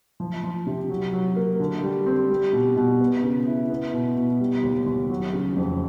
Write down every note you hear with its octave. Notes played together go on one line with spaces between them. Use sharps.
F3
F3
C3
F#3
F#3
A#3
D3
G3
C4
G3
B2
B2
B3
C#3
E4
B3
B2
B2
G3
D#2
D#2
F#3
C#3
F2